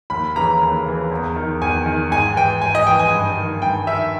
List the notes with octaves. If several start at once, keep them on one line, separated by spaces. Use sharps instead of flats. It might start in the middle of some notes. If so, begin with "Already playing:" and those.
D#2 B5
C#3 E3 A#5
D#2
C#3 E3
E2
D#3
E2 G#5
D#3
G#2 G#5
E3 G5
G#2 G#5
D#5
E3 G5
G#5
G2
D#3
G2 G5
D#3 E5